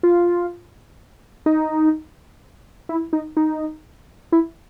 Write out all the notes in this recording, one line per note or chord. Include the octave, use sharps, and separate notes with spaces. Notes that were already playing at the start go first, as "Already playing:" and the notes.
F4
D#4
E4
D#4
D#4
E4